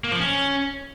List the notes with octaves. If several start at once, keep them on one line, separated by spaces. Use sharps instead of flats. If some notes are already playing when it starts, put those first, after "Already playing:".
A#3
F3
C#4